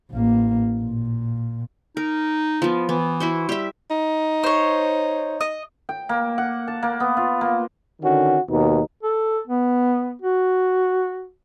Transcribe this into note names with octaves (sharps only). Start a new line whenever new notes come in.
A1 A#3
A#2
D#4 A#4
F3 B3
E3 B3
E4 F#4 C5
G3 G4 E5
D#4
C5 C#5
D#5
G5
A#3
F#5
A5
A#3
B3
F4
A#3
D3 D#3 C#4 F#4
D#2 B2 D#4
A4
B3
F#4